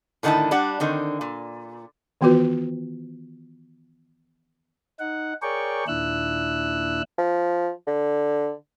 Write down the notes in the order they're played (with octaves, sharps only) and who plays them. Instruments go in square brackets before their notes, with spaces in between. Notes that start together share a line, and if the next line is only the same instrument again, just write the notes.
[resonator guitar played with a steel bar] A2 D3 D#3 D4 E4 A5
G3 D4 F#5
D3 D#3 C4
A#2
[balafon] D#3 E3 B3 F4 F#4 B4
[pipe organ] D#4 F#5
G#4 A#4 C#5 D5 G5 C#6
D#2 A#2 D4 E4 E6 F#6
[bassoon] F3
D3